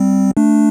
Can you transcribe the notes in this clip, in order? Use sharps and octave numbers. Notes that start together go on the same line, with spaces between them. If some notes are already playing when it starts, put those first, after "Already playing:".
Already playing: G3 C4
A3 D4